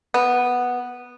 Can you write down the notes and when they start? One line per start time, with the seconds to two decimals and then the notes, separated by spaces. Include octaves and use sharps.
0.14 B3